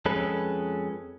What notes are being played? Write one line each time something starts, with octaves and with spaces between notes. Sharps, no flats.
F2 G#3 C#4 A4 B4